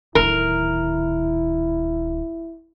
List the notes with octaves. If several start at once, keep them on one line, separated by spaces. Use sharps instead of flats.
D1 D#3 E4 A#4